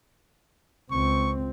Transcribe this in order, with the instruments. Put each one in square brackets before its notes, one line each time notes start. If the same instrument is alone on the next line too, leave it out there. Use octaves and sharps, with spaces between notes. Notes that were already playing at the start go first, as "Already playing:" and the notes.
[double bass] C#2 C4 [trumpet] C#6